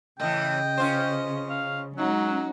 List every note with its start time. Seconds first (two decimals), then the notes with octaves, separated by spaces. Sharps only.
0.20 A2 C#3 E3 D#5 G5
0.78 C#4 F4 C5
1.50 F5
1.98 F#3 G#3 C#4 D#4 F#4